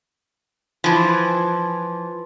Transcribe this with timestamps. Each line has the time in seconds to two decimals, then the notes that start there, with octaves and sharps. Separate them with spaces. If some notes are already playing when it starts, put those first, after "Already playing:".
0.84 E3 F3